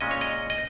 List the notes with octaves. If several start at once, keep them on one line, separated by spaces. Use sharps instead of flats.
A#2 G#3 C#4 D#5
C#5
D#5
D#5